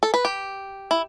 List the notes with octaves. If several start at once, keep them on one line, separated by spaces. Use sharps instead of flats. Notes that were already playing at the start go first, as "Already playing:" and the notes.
A4
B4
G4
E4